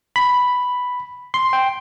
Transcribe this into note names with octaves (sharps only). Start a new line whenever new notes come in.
B5
C6
G5